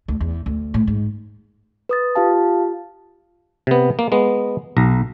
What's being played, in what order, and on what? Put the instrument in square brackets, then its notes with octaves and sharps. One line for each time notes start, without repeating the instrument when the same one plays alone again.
[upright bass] D2
E2
D2
A2
G#2
[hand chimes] B4 D#6 A6
F4 G4 F5 A5
[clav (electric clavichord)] C3 B3
A#3
G#3 B3
B1 A#5